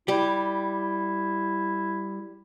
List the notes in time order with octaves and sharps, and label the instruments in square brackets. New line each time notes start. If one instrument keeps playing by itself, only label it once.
[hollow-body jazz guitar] G3 G4 [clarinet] E4